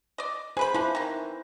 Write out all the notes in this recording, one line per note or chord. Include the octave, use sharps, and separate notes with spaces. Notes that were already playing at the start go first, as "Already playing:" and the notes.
D5 D#5
G#4 B4 C5 B5
F3 D4 E4 B4
D#3 E3